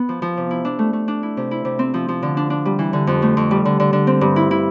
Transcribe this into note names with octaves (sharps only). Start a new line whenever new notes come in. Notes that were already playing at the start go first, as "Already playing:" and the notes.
Already playing: B3
F3
F3
C3
E4
D4
A3
A3
D4
E4
C3
E4
C3
C4
F3
F3
D3
D4
D4
G3
E3
D3
F2
A3
F2
G3
D3
D3
D3
C4
G2
E4
E4